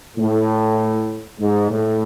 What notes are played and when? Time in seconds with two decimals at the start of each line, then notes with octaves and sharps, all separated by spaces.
0.16 A2
1.40 G#2
1.71 A2